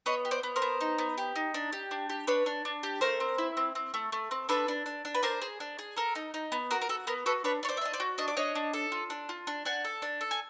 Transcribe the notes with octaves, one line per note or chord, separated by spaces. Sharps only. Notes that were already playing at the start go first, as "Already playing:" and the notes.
B3 C#5 D#5
G4
C5 D5
B3
A#4 C5
B3
D#4
B3
G4
D#4
D4
G4
D4
G4
D4 B4 C#5
D4
D4
G4
A3 A#4 C5
C4
E4
C4
C4
A3
A3
C4
D4 A4 B4
D4
D4
D4
B4
D4 A#4 C5
G#4
D4
G#4
A4 A#4
D#4
D#4
B3
F#4 A#4
A#4
F#4 A4
B3 A#4
F#4 A4 B4
D4 B4 C#5
D4 C#5
C5 D5
E5
D4 D#5
C5 D5
F#4
D4 D#5
D5
D4 C#5 D#5
D4
A4
F4
D4
F4
D4
D4 F#5 G#5
A4
D4
A4
G#5